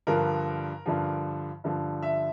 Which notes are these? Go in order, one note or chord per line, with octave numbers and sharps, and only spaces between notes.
G2 D3 F3 A#4
G2 D3 F3
G2 D3 F3
E5